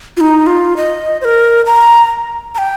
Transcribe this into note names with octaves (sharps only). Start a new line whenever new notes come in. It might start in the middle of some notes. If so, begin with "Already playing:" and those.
F4
D#4
F4
D#5
C5
A#4
A#5
A#5
G5